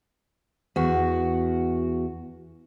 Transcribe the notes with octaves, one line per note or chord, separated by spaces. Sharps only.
E2 F#4